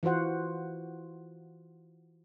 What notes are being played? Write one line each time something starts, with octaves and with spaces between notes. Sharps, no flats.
E3 F4 F#4 C5 F#5